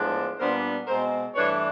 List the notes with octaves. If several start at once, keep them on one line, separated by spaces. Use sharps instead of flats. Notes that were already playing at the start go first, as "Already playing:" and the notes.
Already playing: A2 F3 G#3 B3 D4
A#2 G3 B3 D4 A#4 C5
B2 G#3 C4 A#4 C5
G2 E3 A3 D4 B4 C#5